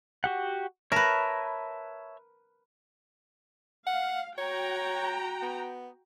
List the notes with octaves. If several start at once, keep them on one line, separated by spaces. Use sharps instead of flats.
F#4 G4 F#5
A#4 B4 C#5 E5 A5
F5 F#5
F#4 C#5 G5 A#5
B3